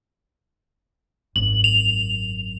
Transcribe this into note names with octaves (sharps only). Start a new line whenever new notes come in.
G#1 F#2 F#7
F7